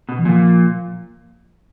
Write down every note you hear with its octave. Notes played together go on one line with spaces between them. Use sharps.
B2
E3
A#2 F3